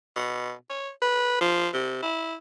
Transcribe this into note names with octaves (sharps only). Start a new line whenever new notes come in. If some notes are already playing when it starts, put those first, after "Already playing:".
B2
C#5
B4
F3
C3
E4